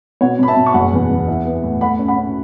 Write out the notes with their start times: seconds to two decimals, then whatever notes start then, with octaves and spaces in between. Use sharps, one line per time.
0.21 B2 C#5 F#5
0.39 B2 B5
0.48 E5 A5
0.57 B2
0.66 C#6
0.74 F#1 F#5 B5
0.93 E2
1.10 E2
1.28 E4
1.45 B3
1.63 A2
1.81 A3 F#5 B5
1.99 C#4
2.08 F#5 B5
2.17 C#4